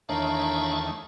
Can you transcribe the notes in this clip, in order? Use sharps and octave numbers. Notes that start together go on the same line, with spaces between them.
E2 D#3 A3 D4 A#4 C#5 E5 F5